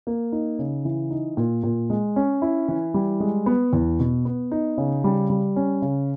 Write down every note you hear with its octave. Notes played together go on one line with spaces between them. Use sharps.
A#3
D#4
C#3
E3
D#4
A#2
A#2
G#3
C#4
E4
E3
G3
G#3
B3
E2
B2
B3
D#4
C#3
G3
G3
C#4
C#3